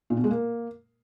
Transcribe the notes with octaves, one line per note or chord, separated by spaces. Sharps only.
A#2
B2
G#3
A#3